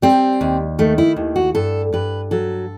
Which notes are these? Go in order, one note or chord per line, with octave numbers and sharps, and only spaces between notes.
G3 C4
D#2
D#3 A3
E4
D#2
F#4
G2 A4
G2 B4
F#3 A4